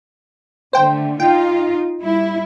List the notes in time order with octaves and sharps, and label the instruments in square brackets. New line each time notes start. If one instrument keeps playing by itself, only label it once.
[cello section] D3 A3 [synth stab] C5 G5
[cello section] D#4 F4 [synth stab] G5
[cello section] G3 E4